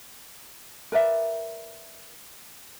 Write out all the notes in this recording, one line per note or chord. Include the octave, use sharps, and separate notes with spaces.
A#4 B4 D5 E5